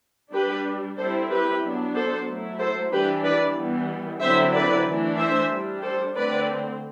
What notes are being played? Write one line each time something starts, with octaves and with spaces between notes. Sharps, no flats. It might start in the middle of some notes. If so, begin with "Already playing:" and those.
G3 D4 G4 B4
G3 C4 E4 A4 C5
G4 B4
F#3 B3 D4
A4 C5
F#3 A3 E4
A4 C5
E3 G3 D4 G4 B4
B4 D5
E3 G3 B3
D3 F#3 C4 E4 C5 E5
B4 D5
E3 A3 D4
C5 E5
G3 D4
A4 C5
D3 A3 C4 B4 D5